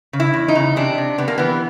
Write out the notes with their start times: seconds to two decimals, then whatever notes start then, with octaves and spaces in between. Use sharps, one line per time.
0.13 C#3
0.20 E4
0.34 E2
0.48 D#4
0.55 C#3
0.76 C3 D4
0.98 C3
1.18 C3 B3
1.28 A#3
1.38 E3 B3